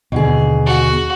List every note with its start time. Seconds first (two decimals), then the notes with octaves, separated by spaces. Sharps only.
0.12 D#2 B2 D3 G#4
0.66 F#4